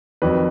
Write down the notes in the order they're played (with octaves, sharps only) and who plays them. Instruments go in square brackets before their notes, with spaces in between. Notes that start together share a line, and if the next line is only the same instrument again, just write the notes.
[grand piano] F2 D#3 F#3 B4